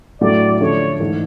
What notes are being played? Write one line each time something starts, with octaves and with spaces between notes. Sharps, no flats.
A2 F#3 A3 D4 D5
D3 F3 A3 D4 C#5
G#2 E3 A3